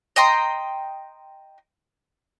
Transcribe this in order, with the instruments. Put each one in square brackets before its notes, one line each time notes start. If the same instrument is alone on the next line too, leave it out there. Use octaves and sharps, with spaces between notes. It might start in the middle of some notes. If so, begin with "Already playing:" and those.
[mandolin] D#5 G5 A#5 C6